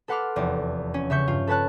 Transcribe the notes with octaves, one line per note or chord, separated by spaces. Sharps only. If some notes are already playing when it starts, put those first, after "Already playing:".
A4 B4 F#5 C6 D6 F6
F1 E2 D5
C#4
C#3 E5 C#6 G6
G2 F4
A4 B4 C#5 A5 F#6